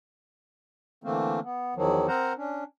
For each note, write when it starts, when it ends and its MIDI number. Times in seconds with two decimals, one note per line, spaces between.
1.04 1.40 50
1.04 1.40 52
1.04 1.40 57
1.04 1.40 58
1.04 1.40 60
1.43 1.74 59
1.76 2.07 40
1.76 2.07 51
1.76 2.07 53
1.76 2.07 54
2.08 2.33 60
2.08 2.33 70
2.08 2.33 72
2.08 2.33 78
2.08 2.33 82
2.37 2.64 61
2.37 2.64 62